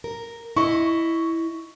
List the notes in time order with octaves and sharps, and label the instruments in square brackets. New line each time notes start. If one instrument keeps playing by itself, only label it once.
[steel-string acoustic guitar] A#4
[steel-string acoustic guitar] E4 D#5 [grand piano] C#6